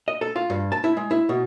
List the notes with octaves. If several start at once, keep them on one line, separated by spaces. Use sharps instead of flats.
D#5
A4
F4
G2
A5
E4
G#3
E4
B2